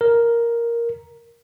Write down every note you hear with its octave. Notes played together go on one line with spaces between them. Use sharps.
A#4